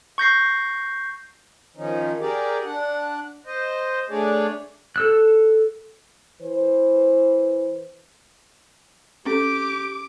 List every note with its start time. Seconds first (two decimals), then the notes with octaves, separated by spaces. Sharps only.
0.18 C#6 G6 A#6 C7
1.76 D#3 F3 C#4 D#4
2.20 G4 G#4 A#4 D5
2.64 D4 F#5
3.46 C5 D#5
4.10 A3 D4 G#4 C#5 D5
4.96 A4 E6 F#6
6.41 E3 B4 C5
9.26 C4 C#4 G4 A4 D6